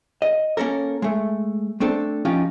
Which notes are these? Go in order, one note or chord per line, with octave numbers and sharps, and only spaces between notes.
D#5
A#3 C#4 A4 A#4
G#3 A3
A3 C4 D4 A4
F3 C#4 D#4 F4 G4